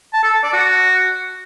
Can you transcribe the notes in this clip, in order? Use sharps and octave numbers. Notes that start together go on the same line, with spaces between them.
A5
A4
A5
D5
F#4